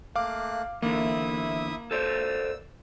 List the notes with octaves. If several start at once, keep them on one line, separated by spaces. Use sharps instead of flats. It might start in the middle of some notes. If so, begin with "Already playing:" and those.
A3 A#3 F5 D6 F#6
E2 D3 A#3 E4 E5 D#6
A4 C5 D5 E6